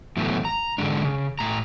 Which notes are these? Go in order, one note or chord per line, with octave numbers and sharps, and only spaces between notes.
A2 D3 E3 F#3 A3 B3
A#5
G#2 D3 G#3 D4
C#3
A2 A#5